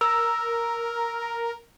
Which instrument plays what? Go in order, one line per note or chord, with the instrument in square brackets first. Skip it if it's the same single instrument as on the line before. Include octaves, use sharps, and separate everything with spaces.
[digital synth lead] A#4 [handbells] E6